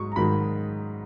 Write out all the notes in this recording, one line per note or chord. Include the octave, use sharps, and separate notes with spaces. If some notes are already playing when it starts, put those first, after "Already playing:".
Already playing: G#2 F#3 C#6 D#6
A#5
G#2 D#3 F#3 B5